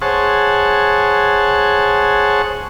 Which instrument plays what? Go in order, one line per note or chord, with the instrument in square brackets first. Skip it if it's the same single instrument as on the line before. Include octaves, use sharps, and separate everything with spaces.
[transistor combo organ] G#4 C5 C#5 F#5 A5